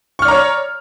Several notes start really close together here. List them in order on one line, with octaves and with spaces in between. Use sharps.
C#6 F6 D5 A#5 C#5